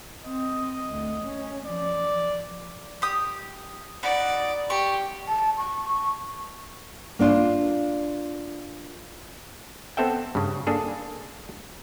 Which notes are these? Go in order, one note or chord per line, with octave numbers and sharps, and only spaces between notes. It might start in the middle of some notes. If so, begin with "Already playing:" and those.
C4 D#5
D2
C#4
F3 D5
G4 D#6
D#4 F#4 D5 B5
G4 C#6
A5
C#6
C#6
A#3 D4 F4
B3 C4 A4 E5 G5
G2 C#3
A#3 D4 G#4 A4